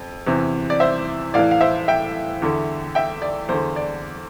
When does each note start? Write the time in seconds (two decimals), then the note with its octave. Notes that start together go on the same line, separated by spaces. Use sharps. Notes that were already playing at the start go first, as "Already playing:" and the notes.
Already playing: F2
0.27 E2 C3 E3
0.70 D5
0.80 C5 E5
1.34 A2 E3 D5 F5
1.51 F5
1.61 C5 E5
1.88 E5 G5
2.42 E2 D3
2.95 E5 G5
3.22 D5
3.49 E2 D3 C5
3.76 D5